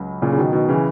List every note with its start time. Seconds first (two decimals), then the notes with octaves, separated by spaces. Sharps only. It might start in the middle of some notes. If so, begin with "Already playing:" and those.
Already playing: C#2 F#3
0.22 A#2 C#3
0.32 C#3
0.38 B2 D#3
0.53 B2 D#3
0.69 C#3 E3